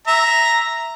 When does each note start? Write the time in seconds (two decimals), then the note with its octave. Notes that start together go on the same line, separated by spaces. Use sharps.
0.07 E5 A#5